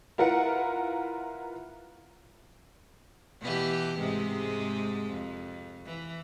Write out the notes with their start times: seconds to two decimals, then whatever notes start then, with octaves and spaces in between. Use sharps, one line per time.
0.18 E4 F4 A#4 B4 F#5
3.41 B2 E3 G4
4.00 G#2 C3 G#3
5.12 F2
5.86 E3